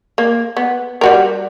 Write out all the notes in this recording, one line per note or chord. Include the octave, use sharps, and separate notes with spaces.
A#3
B3
G3 F#4 A#4